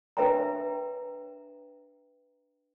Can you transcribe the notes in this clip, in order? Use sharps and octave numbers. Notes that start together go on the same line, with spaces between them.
D4 B4 E5 G5 A#5